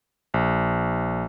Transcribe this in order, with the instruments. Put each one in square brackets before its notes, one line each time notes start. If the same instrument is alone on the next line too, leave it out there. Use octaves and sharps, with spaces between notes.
[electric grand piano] A#1